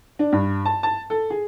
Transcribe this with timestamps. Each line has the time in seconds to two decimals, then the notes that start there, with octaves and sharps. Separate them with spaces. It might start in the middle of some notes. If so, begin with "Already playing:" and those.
0.19 D4
0.32 G2
0.65 A5
0.83 A5
1.10 A4
1.30 G#4